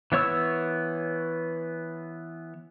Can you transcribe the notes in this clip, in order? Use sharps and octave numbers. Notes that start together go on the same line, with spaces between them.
E3 B3 C#5 C#6 E6